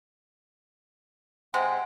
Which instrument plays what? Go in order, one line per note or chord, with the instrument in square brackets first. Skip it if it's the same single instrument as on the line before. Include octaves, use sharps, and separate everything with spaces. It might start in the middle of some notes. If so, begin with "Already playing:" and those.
[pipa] C3 G#3 C4 [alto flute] F#5